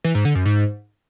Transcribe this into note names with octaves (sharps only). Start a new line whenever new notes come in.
E3
G#2
D3
F#2
G#2